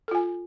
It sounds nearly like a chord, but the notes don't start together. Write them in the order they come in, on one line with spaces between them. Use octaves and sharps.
A4 F4 G#5